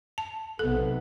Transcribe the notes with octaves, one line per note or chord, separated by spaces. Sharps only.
A5
B1 C3 B3 A4